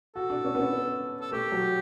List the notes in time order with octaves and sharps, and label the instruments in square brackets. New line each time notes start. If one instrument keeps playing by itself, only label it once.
[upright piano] F#4 [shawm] A4
[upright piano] D4
C#4
B3
C#4
[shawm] A4
[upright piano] A3 [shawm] G4
[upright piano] F#3